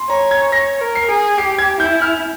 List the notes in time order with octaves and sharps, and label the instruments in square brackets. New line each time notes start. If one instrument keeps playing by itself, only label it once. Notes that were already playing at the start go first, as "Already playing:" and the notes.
Already playing: [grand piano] C6
[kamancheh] C#5 [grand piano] A#5
[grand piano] G#6
[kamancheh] C#5 [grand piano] A#6
[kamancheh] A#4
[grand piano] C7
[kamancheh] G#4
[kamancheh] G4 [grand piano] C7
[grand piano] G#6
[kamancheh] E4 [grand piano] G6
[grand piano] F6